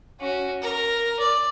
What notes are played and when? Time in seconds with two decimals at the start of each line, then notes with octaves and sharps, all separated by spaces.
0.19 C#4 F#4
0.62 A#4
1.19 D5